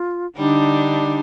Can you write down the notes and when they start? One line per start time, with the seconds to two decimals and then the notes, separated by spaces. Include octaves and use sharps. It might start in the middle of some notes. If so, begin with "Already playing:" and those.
Already playing: F4
0.37 D3 G3 D4 D#4